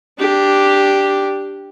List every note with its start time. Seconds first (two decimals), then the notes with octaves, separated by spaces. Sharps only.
0.19 D4 G4